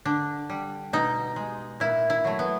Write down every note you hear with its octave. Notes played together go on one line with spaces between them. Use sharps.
D3 D4
G3
B2 D#4
G#3
A#2 E4
E4
F#3 A3
B3